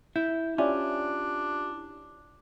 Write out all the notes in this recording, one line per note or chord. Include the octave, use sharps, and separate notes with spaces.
E4 G6
C#4 D4 E4 F4 G4 D5 E5 G#5